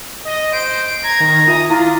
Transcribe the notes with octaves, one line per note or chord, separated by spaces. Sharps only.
D#5
C5 D7
A#5 G#6
D#3
F4 E5 G#5 D#6
D4 E4 F4 A#5